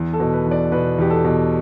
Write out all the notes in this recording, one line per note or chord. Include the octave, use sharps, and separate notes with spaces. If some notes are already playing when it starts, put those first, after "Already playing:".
Already playing: E2
A4
B2
B4
E2
D5
B2 B4
E2 G4
A4
B2